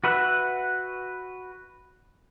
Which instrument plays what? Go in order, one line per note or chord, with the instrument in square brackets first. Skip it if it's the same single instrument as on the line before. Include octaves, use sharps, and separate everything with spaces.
[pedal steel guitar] F#4 B4 E5 F#5